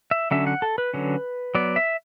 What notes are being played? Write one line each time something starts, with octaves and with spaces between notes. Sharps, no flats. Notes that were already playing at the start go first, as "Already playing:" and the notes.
E5
D3 F#3 C#4 E5
F#5
A4
B4
D3 F#3 C#4
F#3 B3 D5
E5